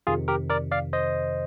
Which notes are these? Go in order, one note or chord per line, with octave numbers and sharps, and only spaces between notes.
F2 C3 D#3 F4 G#4
G4 A#4
A#4 D5
D5 F5
C5 D#5